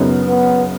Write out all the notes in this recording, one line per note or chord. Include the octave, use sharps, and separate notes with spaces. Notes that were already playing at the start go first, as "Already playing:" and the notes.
Already playing: F#2 C#3 B3 D#4
B3